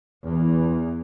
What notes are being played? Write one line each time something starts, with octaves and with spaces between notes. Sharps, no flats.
E2 E3